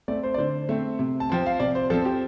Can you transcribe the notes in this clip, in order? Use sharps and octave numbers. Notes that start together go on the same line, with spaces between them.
A3 C4 D5
C5
D5
D3 C5
A3 C4
C3
A5
F3 C4 G5
F5
C3 D5
C5
F3 C4 A4
G4